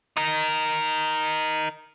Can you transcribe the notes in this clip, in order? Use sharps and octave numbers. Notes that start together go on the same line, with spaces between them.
D#4 A#4